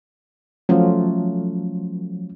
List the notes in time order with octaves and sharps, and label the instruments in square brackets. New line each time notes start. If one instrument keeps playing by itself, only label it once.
[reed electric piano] F3 F#3 [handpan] A3 C#4 F4